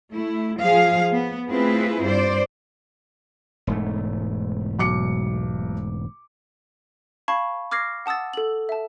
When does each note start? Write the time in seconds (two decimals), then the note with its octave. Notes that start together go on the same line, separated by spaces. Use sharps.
0.13 A3 E4
0.62 F3 G#4 F5
1.15 B3
1.50 A3 C4 E4 F4 G#4 B4
2.06 G2 C5 D5
3.67 E1 G#2 A3
4.79 B1 D6 C#7
7.28 F5 A5 B5 C#6 G#6
7.71 D6 F6 G#6 A#6 C7
8.06 F#5 A5 D#6 E6 A6
8.33 A4 F#7
8.69 E5 A5